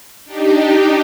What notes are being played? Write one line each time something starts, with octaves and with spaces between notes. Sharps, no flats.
D4 D#4 G4